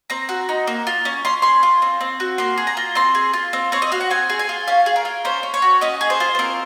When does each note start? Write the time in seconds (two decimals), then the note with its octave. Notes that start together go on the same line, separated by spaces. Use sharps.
0.10 C4 A#5
0.29 F#4
0.49 D#4
0.67 A#3
0.87 F4
1.05 C#4
1.25 C#4 C6
1.42 G#4 C6
1.63 F4
1.82 C4
2.01 C4
2.20 F#4
2.38 A#3 C6
2.58 G#4
2.67 A#5
2.77 F4
2.95 C4 C6
3.15 G#4
3.33 F4
3.53 C4
3.72 C4 C#5
3.82 D#5
3.92 F#4 F5
4.01 F#5
4.10 C4 G#5
4.30 G#4
4.39 G#5
4.49 F4
4.68 C#4 F5
4.86 G#4
4.96 A#4
5.05 F4
5.25 C#4 C5
5.43 C#4
5.54 C#5
5.62 F#4
5.81 C#4 D#5
6.01 G#4
6.10 C5
6.20 F4
6.35 C5
6.39 C4 A#4